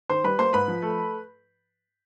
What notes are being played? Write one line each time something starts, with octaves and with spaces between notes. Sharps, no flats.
D#3 C5 C6
G3 B4 B5
A#3 C5 C6
G#2 B4 B5
F3
A3